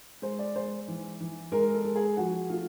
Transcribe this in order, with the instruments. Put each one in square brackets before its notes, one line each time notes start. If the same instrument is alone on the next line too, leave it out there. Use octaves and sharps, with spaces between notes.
[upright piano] G#3 C5
D5
G#3 C5
E3
E3
G#3 A#4
A4
G#3
G#4
F3 F#4
A3 F4